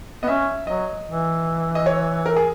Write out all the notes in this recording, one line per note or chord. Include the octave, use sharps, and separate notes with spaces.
B3 D#5
C#4 E5
F#3 D#5
E3
D#5
C#5
A#4
G#4